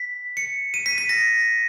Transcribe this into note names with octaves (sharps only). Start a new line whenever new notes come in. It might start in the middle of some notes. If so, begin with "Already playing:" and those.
Already playing: B6
C#7
D#7
B6
B6
A#6